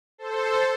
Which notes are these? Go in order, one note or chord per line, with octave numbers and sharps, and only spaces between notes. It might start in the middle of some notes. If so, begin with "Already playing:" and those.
A4 C5